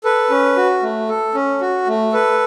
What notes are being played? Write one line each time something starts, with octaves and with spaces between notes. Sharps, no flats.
A4 B4
C#4
F#4
A3
A4
C#4
F#4
A3
A4 B4